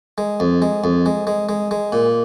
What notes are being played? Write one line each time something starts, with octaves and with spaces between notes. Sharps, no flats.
G#3
F2
G#3
F2
G#3
G#3
G#3
G#3
A#2